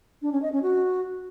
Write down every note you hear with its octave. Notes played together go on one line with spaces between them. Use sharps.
D4
C#4
D#5
C#4
F#4